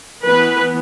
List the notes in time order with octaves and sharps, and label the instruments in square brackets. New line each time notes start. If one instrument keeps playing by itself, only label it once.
[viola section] E3 B3 B4